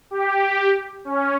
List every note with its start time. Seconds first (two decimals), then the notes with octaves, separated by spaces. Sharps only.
0.11 G4
1.05 C#4